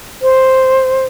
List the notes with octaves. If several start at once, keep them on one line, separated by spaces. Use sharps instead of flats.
C5